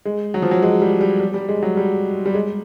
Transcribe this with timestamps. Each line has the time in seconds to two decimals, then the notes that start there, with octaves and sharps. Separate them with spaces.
0.05 G#3
0.34 F#3
0.42 F3
0.51 F#3
0.62 G#3
0.82 G3
1.01 G3
1.20 G3
1.34 G3
1.49 G#3
1.62 F#3
1.77 G3
2.26 G3
2.35 G#3